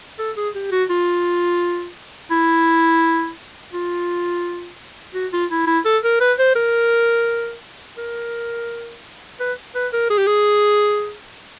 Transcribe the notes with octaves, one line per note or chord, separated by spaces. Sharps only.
A4
G#4
G4
F#4
F4
E4
F4
F#4
F4
E4
E4
A4
A#4
B4
C5
A#4
A#4
B4
B4
A#4
G#4
G4
G#4